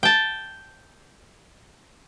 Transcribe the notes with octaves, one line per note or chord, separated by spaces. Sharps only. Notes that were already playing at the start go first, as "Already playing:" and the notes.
G5 A5